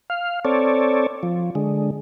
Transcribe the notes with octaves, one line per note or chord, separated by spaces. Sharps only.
F5
C4 A4 C#5 D5
F3
D3 G#3